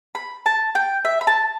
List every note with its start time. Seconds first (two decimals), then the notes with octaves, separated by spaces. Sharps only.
0.15 B5
0.46 A5
0.75 G5
1.05 E5
1.21 B5
1.27 A5